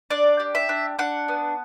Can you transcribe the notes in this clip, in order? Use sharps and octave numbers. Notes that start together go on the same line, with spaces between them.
D4 D5
G4
E5
D4
D4 F#5
B3